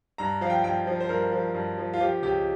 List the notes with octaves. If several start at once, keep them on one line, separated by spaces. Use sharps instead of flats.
G2 A#5
F3 F5
G5
G2 G5
F3
C5
G2 A#4
F3
G2
F3
F4
F3 G4
C#2 G4